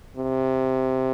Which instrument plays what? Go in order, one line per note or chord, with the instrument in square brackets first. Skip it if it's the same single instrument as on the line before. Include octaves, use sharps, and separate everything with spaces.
[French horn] C3